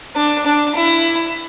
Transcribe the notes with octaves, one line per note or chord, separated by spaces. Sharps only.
D4
D4
E4